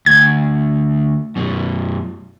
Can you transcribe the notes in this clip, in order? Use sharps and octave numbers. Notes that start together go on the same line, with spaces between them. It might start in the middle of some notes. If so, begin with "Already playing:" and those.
D2 G#6
F#2 B2